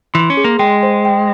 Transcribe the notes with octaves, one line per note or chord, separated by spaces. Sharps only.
E3 C6
C#4
G#4
A#3
G#3 G5
C5
G5